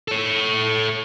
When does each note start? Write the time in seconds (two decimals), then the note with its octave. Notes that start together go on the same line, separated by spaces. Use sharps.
0.08 A4 C#5